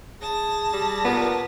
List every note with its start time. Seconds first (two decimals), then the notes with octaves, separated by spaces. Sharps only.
0.22 G#4 A5 A#6
0.73 G3
1.04 A#2 B3